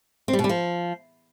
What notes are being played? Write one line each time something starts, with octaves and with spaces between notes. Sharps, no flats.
C4
G3
B2
G3
F3